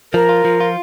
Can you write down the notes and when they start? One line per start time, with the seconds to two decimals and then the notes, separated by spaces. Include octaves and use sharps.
0.13 F3 A#4
0.29 F4
0.45 F3
0.60 F4